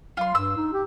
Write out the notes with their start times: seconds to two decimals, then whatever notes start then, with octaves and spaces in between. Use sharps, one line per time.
0.17 F#3 F4 C6
0.35 G2 E6
0.57 D#4
0.73 G4